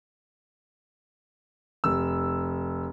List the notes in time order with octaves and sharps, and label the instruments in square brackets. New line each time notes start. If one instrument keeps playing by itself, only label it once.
[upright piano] F1 E6